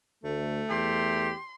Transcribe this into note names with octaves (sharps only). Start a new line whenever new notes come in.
D2 A3
E2 G4 C6